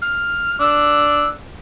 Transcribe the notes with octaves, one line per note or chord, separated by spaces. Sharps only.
F6
D4 E6